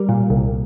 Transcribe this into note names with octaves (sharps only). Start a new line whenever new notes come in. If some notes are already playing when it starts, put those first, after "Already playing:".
Already playing: G3 A#4
A#2
C2